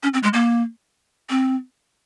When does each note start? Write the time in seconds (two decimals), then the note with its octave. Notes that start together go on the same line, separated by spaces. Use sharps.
0.03 C#4
0.14 C4
0.23 G#3
0.34 A#3
1.30 C4